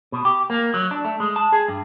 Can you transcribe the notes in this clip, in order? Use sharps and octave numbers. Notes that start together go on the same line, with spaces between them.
B2
G4
A#3
F#3
D4
A3
G#3
A5
G#4
G2